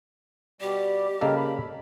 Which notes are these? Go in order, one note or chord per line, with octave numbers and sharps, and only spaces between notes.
B2 G3 G4 D5
C#3 G3 A#3 A4 A#4 D#5
B5